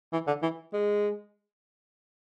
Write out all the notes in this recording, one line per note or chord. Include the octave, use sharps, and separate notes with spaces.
E3
D3
E3
G#3